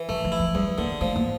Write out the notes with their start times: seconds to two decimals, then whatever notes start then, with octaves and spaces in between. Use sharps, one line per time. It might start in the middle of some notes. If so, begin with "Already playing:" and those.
Already playing: E3
0.09 F3 A3
0.25 F3
0.32 E4
0.40 F3
0.55 E2 G3
0.78 D3 A#3
1.01 F3 A3
1.16 A#3